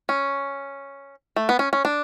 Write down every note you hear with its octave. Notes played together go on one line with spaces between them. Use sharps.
C#4
A3
B3
C#4
C#4
D4